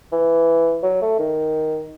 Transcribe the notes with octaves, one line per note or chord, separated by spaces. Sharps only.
E3
F#3
A3
D#3